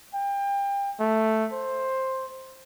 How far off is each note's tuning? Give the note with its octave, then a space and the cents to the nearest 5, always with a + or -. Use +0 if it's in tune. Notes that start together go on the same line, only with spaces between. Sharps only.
G5 +30
A3 +0
C5 +10